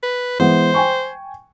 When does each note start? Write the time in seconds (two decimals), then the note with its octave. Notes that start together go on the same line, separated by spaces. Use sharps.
0.03 B4
0.39 E3 G#3 B3 C5
0.74 G5 G#5 C#6